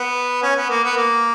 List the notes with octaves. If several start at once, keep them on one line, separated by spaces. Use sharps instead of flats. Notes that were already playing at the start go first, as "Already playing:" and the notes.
Already playing: B3
C#4
B3
A#3
B3
A#3